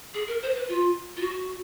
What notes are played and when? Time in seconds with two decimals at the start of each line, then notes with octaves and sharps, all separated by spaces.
0.14 G#4
0.27 A#4
0.42 C5
0.55 B4
0.69 F4
1.17 F4
1.21 F#4